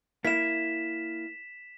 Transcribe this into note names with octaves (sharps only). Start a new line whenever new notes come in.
A#3 E4 B6 E7